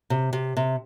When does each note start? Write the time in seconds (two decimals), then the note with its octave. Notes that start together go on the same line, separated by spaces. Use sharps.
0.10 C3
0.33 C3
0.57 C3